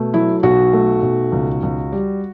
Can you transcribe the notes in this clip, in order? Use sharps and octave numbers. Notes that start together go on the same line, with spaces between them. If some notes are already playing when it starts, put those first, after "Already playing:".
Already playing: B2 A3
F#3 E4
B1 F#4
A3
B1
C#2
C#2
G3